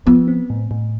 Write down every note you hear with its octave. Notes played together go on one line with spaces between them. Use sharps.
F3 B3
C4
A2
A2